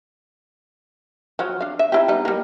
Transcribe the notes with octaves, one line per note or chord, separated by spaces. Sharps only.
F3 F#3 F4
D4 F5
E5
D#4 E4 G4
G3 B3 D#4
G3 A#3